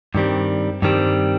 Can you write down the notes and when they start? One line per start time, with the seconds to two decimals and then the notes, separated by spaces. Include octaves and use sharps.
0.15 G2 D#3 G3 C4
0.82 G2 D#3 G3 C4